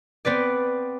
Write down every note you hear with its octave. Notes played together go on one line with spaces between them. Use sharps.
B3 C4 B4 D5